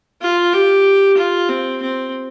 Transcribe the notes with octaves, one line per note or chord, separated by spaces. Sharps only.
F4
G4
F4
C4
C4